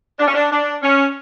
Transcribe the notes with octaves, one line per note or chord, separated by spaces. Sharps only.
D4
C#4
D4
D4
C#4